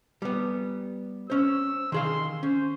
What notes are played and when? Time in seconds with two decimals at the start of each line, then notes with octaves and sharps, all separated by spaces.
0.22 G3 B3
1.30 C#4 C5 E6
1.92 D#3 G#4 F5 C6
2.43 C#4 C5